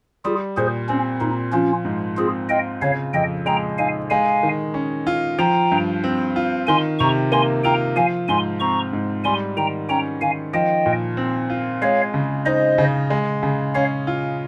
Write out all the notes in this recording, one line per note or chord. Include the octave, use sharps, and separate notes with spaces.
G3 F4 G#4
A#2 G#4 C5
C4 C#4
A#2 D#4
F3 C#4 F4
G#2
C4 F4 G#4
F4 D#5 G5
C#3 C#5 F5
F2 D#5 G5
G#3 G5 A#5
D#4 F5 G#5
G#3 F5 G#5
D#3
C#4
F4
F3 G5 A#5
G2
C4
F4
D#3 G#5 C6
C3 A#5 C#6
A#3 G#5 C6
F4 G5 A#5
F3 F5 G#5
G#2 G#5 C6
C4 A#5 C#6
G#2
G3 G#5 C6
D#3 G5 A#5
C#4 G5 A#5
D#3 F5 G#5
F3 D#5 G5
A#2
C4
F4
G#3 C#5 F5
C#3
D#4 C5 D#5
C#3
G#3
C#3
C#4 C#5 F5
F4